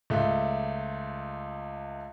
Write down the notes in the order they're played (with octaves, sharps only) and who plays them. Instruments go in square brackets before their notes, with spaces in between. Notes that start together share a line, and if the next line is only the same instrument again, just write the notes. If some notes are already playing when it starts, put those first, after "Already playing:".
[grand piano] C#2 A3